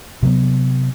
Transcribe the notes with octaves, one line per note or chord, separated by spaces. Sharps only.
C3 F#3 B3